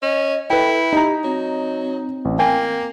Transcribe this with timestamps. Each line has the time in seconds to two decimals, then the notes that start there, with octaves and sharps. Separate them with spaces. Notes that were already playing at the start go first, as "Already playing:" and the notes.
0.02 C#4 D#5
0.50 E4 A4 B4 G5
0.93 D#4 G4 A#5
1.24 F#3 C4
2.25 A1
2.39 A#3 G5 G#5